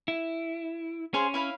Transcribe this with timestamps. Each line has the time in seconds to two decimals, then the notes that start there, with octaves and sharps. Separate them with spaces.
0.08 E4
1.14 C#4 G#4 C5 F5
1.34 E4 F5 B5